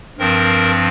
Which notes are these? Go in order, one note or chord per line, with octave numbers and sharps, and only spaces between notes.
G2 F3 C4 A#4